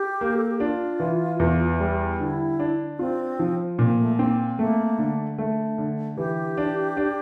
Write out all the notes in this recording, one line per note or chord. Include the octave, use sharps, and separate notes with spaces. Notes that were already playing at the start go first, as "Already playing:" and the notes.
Already playing: G4
A#3
A4
G4
D4 F4
E3
E2
G3
D3 E4
D4
C4 F4
F3
A#2 C4
A3
A#3 C4
A3 A#3
D3
A3
D3
E3 G4
D4
D4